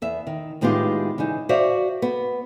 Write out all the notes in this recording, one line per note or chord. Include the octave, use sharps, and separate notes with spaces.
E2 E5
D#3
A2 D#3 G#3 B3 F4 G4
C#3 E3 D#4
F#4 C5 D5 E5 F5
B3